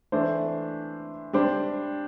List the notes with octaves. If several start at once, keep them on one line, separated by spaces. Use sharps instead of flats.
E3 A3 D4 C5
G3 D4 G4 C5